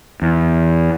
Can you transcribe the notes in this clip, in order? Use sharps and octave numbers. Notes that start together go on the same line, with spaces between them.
E2